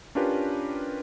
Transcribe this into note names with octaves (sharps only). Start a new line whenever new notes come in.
C#4 D4 F4 G4 A#4 B4